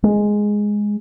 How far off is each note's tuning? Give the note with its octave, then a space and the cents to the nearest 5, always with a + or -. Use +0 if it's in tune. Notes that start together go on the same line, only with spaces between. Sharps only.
G#3 +0